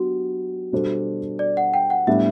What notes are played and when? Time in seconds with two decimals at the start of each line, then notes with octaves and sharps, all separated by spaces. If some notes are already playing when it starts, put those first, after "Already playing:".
Already playing: F#3 B3 D4 F#4 G4
0.72 B2 G3 D4 A4 C5
1.39 D5
1.57 F#5
1.74 G5
1.90 F#5
2.07 A2 G3 B3 D4 E5